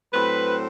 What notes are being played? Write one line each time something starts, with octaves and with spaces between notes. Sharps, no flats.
A2 F#3 C4 B4